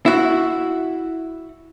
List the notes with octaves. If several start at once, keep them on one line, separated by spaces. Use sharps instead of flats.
E4 F#4